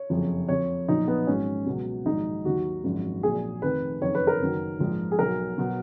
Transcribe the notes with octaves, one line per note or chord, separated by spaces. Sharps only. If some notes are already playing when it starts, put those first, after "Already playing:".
Already playing: C#5
F#1 F2 F3
F2 F3 C#5
B1 A#2 F3 D#4
B3
G#1 G#2 F#3 C#4
C#2 B2 F#3
A#1 G#2 D#3 F#3 D#4
D#2 D#3 F#3 F#4
G#1 F#2 F3
A#1 A#2 F#3 G#4
F1 F2 D#3 B4
F#1 F2 D#3 C#5
B4
A#4
F#1 F#2 D#3 F#3
A#1 G#2 F3
G#4
B1 B2 F#3 A#4
B2 F#3